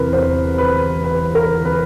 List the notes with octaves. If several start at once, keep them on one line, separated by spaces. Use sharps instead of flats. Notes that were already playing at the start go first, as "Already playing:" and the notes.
Already playing: E2 C3 E3 A#4 B4
C5
B4
B4
A#4
B4